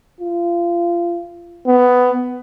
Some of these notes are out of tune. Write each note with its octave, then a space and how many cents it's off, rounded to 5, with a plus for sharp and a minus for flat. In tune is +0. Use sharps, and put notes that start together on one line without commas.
F4 -25
B3 +10